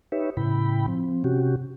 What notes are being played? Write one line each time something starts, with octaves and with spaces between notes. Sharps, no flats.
D#4 G4 B4 C#5 E5
A2 C#3 E4 G5 B5
F3 C4
C3 C#4 F#4 G4